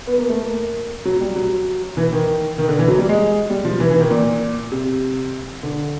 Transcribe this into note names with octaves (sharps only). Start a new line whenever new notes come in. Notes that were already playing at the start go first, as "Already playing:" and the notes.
B3
A#3
A3
A#3
F#3
G3
F#3
E3
D#3
D#3
D3
E3
F#3
G3
G#3
G3
F3
E3
E3
D#3
A#2
C3
D3